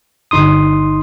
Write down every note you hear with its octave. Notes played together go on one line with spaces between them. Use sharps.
G1 D#4 C6 D#6